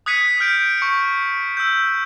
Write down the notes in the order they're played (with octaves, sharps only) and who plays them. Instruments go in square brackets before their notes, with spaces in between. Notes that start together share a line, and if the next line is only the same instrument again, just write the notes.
[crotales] D#6 F#6 G#6 B6 C#7 D#7
F6 G6 D7
C#6 C#7
E6 G6